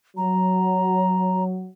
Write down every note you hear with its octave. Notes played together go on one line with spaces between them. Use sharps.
F#3 A#5